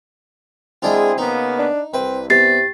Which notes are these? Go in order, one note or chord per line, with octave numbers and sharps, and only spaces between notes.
G#3 C4 D4 E4 F4 G#4
C#3 A#3 B3 D#4
D4
C2 C4 B4
C3 B3 G4 A6 C7